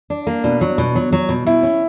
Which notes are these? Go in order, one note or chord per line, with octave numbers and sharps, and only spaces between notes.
D4
A#3
B2 D4
F#3
B2
F#3
F#3
B2
B2 E4
C#4